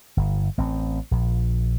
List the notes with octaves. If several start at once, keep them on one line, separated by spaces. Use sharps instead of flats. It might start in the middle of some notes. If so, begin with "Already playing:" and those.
G1
A1 C4
A#1